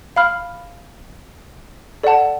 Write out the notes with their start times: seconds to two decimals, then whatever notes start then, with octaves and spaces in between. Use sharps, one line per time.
0.16 F5 B5 F6
2.03 A4 D5 F#5 A5